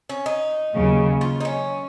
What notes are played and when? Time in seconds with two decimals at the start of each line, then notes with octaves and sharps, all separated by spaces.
0.09 C#4
0.26 D#4
0.73 D#2 C#3 F#3
1.21 F4
1.40 D#4
1.45 C#4